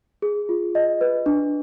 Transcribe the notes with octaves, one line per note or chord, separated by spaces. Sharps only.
G#4
F4
D#5
B4
D4